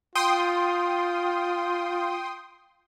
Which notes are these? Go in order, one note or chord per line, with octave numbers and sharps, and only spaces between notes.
F4 G5 C6 D#6